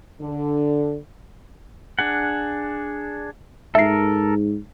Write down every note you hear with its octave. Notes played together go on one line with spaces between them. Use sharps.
D3
D4 G#4 F#5
G#2 A4 A#4 E5 C7